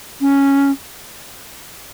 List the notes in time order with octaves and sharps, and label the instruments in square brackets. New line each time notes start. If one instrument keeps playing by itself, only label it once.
[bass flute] C#4